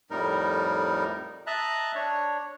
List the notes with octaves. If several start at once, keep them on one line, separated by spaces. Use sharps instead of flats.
F2 A2 G3 D#4 A#4
D#5 E5 A5 A#5 F#6
D4 C#5